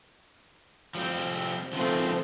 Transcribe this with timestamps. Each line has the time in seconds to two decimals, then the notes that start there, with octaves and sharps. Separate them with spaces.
0.95 F3 G3 C4
1.73 D3 D#3 F3 A3 C4